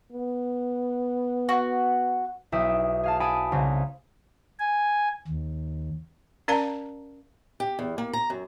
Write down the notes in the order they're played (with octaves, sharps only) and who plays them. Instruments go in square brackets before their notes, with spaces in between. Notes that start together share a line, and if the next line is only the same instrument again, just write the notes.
[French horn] B3
[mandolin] F#4
[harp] B1 E4 G4 E5 D#6 D7
G#4 F5 A5
G#5 A5 B5 D#6 D7
C2 C#3
[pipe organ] G#5
D#2
[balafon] C#4 A#4 D5 F5 A5 A#5
[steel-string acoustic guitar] G4
E2
A#3
A#5
F#2